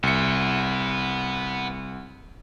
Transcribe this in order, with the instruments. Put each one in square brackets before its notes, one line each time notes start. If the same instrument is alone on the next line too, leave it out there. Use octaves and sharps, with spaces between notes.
[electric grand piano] C2 C#7 [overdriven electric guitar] B3 E5